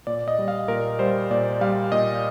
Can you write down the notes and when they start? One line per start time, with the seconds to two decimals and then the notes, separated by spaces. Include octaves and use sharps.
0.07 A#2 D5
0.28 D#5
0.39 G3
0.48 F5
0.68 A#2 A#4
0.99 G3 C5
1.30 A#2 D5
1.61 G3 F5
1.92 A#2 D#5